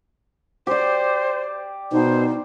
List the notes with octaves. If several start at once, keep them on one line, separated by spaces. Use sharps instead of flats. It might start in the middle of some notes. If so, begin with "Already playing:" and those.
G4 C5 D5
B2 D#4 C5